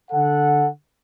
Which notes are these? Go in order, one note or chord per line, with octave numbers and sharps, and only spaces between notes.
D3 A4 F#5